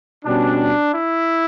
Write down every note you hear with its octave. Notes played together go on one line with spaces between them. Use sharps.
B2 G3 C#4 D4
E4